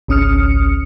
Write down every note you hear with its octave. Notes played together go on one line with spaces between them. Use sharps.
G#1 C#2 C#4 D#6 F6 C#7